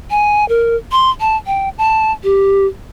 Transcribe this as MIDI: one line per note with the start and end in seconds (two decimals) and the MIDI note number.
0.10 0.47 80
0.49 0.76 70
0.92 1.10 84
1.20 1.36 81
1.47 1.69 79
1.78 2.12 81
2.24 2.66 67